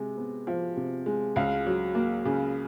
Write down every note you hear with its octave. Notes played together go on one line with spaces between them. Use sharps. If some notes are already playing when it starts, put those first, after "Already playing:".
Already playing: C3 G#3
B3
F3
C3
G#3
C#2 F5
F#3
A#3
C#3